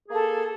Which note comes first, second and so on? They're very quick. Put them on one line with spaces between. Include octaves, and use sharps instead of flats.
G#4 A#3 A4